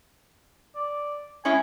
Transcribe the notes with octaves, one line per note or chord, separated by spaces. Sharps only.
D5
G#3 C#4 E4 G#5